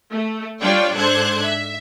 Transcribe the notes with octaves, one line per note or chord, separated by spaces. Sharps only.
A3
G3 D4 F4 C#5 D5 G5
G#2 D4 A4 C5 F#6 G#6
E5